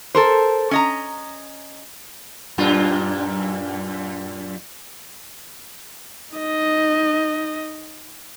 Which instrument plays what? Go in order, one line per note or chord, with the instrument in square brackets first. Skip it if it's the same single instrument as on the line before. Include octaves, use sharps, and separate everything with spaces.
[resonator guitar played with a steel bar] A4 A#4 C5
C#4 D#5 A#5
[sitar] F#2 A#2 F4
[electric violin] D#4 D#5